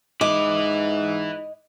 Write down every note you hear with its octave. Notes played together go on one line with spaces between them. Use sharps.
G#2 E4 B4 D#5 D6